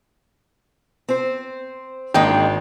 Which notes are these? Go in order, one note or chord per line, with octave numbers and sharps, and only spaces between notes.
C4 C5
G#1 G#3 A#3 D4 D#4 G5